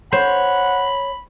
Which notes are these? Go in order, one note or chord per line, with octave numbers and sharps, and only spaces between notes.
C5 C#5 F#5 B5